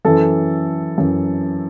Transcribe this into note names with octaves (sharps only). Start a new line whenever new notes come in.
F#2 E3 A4
F#2 E3